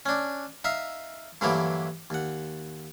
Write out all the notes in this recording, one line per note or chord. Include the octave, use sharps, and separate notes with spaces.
C#4 D4
D#4 E5 F5
G2 D3 E3 F#3 A#3 E4
D#2 F#5